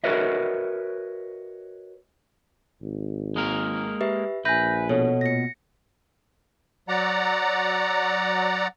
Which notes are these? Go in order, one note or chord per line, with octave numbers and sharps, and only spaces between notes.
F#4 A#4 B4 C#5 D#5 E5
G#1
G#3 A#3 A#4
G4 B4 E5
A#1 B4 E5 G#5 G6 A#6
B2 A4 C#5
A#2 A#6 C#7
F#3 D5 F#5 A#5